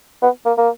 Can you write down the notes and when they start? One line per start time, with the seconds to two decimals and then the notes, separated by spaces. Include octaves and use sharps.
0.22 B3
0.46 A#3
0.58 A#3